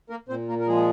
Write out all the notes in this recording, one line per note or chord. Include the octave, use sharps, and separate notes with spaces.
A#3 A#4
A#2 C4 C5
A#3 A#4
A#4
F3 G#3 G#4